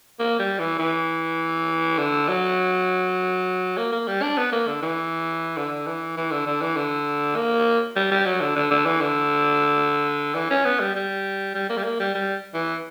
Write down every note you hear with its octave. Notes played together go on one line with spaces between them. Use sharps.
A#3
G3
E3
E3
D3
F#3
A#3
A#3
G3
D4
B3
A#3
D3
E3
D3
E3
E3
D3
D3
E3
D3
A#3
G3
G3
F#3
D3
D3
D3
E3
D3
E3
C#4
B3
G3
G3
G3
A#3
G3
A#3
G3
G3
E3